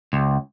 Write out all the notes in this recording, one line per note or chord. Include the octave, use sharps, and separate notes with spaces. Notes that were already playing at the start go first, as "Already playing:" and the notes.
C#2